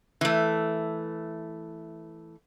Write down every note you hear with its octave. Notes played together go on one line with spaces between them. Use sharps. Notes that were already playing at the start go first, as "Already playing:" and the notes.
E3 A3